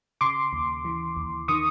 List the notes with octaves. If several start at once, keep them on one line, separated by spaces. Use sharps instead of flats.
C#3 C6 D6
D#2
E3
D#2
D#3 C#6 D#6